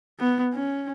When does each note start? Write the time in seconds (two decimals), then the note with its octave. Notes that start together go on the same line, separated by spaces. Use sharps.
0.20 B3
0.54 C#4